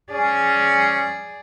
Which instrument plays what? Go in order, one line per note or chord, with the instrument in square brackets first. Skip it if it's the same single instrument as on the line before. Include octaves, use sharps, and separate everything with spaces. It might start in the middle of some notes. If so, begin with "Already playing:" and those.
[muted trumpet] C#4 [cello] G#4 D5